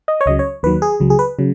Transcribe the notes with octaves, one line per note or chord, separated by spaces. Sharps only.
D#5
C#5
C#2 C#3 F#3 D#5
C#5
D#2 D#3 F#3 B4
G#4
C#2 C#3 F#3
G#4
B4
C#3 F#3